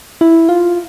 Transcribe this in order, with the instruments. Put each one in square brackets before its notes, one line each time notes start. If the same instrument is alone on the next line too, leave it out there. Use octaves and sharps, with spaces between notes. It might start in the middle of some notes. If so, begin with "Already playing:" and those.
[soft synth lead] E4
F4